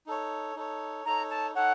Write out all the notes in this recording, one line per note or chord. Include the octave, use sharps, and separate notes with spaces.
D#4 A4 C#5
D#4 A4 C#5
D#4 A4 C#5 A#5
A5
D#4 A4 C#5 F#5